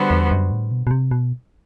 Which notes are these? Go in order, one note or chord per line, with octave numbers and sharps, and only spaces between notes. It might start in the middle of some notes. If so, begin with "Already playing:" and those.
Already playing: D3 G3 B3 F#4 C5
E2
F#2
A2
B2
B2
C3
B2